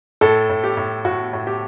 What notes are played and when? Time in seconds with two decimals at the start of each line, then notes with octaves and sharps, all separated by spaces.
0.21 A2 A4
0.49 A2
0.64 G4
0.77 A2
1.05 A2 F#4
1.33 A2
1.47 G4